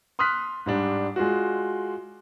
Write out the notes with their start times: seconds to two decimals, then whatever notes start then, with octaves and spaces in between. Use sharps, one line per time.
0.19 C6 D#6 F6 F#6 B6
0.66 G#2 G3 D4
1.16 G#3 F4 F#4